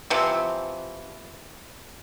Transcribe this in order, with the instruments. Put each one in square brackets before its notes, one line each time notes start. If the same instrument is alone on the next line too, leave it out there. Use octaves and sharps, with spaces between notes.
[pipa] C3 E3 F3